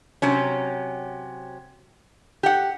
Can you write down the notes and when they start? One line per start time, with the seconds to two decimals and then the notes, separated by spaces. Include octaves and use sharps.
0.22 C3 F#3 C#4
2.43 G4 F#5